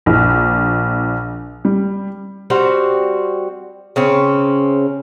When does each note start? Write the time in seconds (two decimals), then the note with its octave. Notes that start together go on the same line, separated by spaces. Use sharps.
0.06 A#1
1.65 G3
2.50 G3 C4 F#4 C5
3.96 C#3 C4 C#4